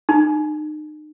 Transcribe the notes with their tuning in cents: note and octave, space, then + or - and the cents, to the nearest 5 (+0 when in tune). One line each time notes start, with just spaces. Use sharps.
D#4 -35